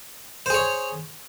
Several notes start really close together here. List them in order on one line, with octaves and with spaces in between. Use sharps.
C5 G#4 C#5